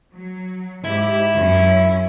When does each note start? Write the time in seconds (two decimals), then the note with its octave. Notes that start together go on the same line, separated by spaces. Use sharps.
0.13 F#3
0.84 G#2 E4 G4
1.35 F#2 C#4